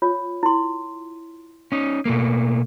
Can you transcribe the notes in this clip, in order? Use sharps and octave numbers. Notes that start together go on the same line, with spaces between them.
F4 C#5
E4 C6
C#4 D#4
B2 A3 A#3